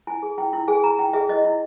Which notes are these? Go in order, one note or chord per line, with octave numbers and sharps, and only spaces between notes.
E4 G#5
G#4
E4 G5
E4
G#4 G#5
E4 A#5
E4 G5
G#4 E5
E4 D#5
E4